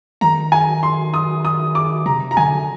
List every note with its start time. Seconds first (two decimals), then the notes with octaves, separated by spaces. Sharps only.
0.21 D#3 A#5
0.52 G#5
0.83 C6
1.14 D#6
1.45 D#6
1.75 D6
2.06 C3 A#5
2.31 A#5
2.37 D3 G#5